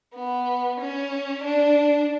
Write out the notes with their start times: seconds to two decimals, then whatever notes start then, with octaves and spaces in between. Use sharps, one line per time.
0.14 B3
0.80 C#4
1.44 D4